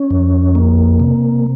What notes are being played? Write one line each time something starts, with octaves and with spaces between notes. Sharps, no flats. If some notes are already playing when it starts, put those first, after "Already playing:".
Already playing: C#4
F2
A#3
C3